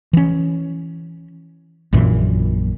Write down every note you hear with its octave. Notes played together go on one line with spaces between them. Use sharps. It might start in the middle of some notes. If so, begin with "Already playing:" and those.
E3 C#4
A#1 F#2 A#2 E3